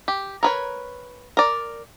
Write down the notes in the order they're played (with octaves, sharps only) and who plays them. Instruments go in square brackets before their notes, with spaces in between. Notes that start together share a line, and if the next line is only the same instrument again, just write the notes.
[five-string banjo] G4
A#4 B4 C#5
A#4 D5